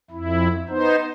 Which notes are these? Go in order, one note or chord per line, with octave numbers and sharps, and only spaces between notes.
F2 E4
B3 D#4 C5